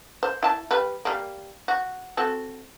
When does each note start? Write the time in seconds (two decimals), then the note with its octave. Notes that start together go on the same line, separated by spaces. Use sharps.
0.23 C5
0.43 E4 A5
0.71 G3 B4
1.05 G3 A#3
1.68 F#4
2.17 C4 F#4 A4